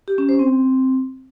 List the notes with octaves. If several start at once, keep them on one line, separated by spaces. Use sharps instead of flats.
G4
C#4
C5
C4